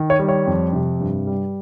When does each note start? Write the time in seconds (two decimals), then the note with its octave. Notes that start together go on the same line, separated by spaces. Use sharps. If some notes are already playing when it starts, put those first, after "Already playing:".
Already playing: D#3
0.10 C#5
0.19 G3
0.28 C#5
0.47 F2
0.73 C3
1.00 G2
1.27 G3